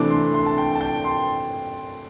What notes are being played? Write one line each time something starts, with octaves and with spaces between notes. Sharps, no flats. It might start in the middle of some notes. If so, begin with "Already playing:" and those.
Already playing: C3 E3 A3 D4 D6
C6
C6
A5
G5
A5
G5
C6